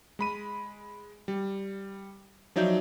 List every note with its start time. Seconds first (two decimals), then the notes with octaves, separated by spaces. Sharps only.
0.19 G#3 B5 D#7
1.28 G3
2.56 F3 F#3 D#4 D5 E5 G6